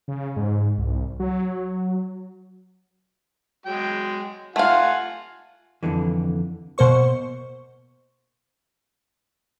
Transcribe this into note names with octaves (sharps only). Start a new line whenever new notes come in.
C#3
G#2
C2
F#3
F#3 G#3 G5
A3 F4 F5 F#5 G#5
F2 B2 D3 E3
B2 A#3 C5 C#6